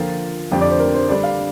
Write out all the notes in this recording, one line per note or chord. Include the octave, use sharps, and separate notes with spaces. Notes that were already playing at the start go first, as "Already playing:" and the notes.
Already playing: D3 F3 A#3 F4 G5
F2 D3 F3 D4 G4 G5
D5
C5
A#4
C5
D3 G3 D4 D5
F5